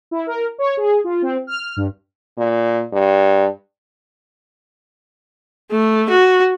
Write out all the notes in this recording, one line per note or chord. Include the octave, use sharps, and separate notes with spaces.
E4
A#4
C#5
G#4
F4
C4
F6
G2
A#2
G2
A3
F#4